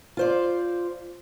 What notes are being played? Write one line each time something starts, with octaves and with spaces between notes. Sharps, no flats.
F4 C5 D5